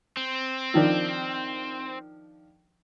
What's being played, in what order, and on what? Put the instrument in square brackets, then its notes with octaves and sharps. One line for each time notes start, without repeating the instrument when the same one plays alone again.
[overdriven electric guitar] C4
[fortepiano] D#3 F3 D4